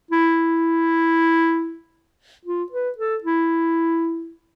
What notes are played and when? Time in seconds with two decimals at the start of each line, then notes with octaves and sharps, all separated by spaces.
0.11 E4
2.46 F4
2.72 B4
2.98 A4
3.24 E4